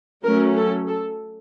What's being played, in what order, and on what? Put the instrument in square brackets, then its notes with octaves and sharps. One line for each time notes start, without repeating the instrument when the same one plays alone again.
[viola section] F#3 A3 C#4 A#4
A4
A4